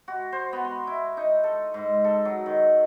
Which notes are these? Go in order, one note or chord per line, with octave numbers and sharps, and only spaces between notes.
F#4
C5
B3
C6
E4
D#4
A4
G#2
A4
F#3
D#3